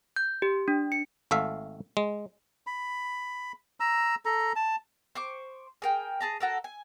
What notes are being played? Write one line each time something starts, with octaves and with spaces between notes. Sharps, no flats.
G6
G4
D4
C#7
G#1 A3 E5 F5
G#3
B5
A#5 E6
A4 A#5
A5
C5 C#6 D6
G#4 A#4 G5
G#4 A5 A#5
F#4 A4 A#4
G#5